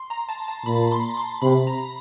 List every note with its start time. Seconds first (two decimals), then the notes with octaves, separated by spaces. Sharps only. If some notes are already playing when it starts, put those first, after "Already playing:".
Already playing: C6
0.10 A#5
0.29 A5
0.48 A5
0.66 A#2 B5
0.92 C6
1.17 C6
1.42 C3 B5
1.67 A#5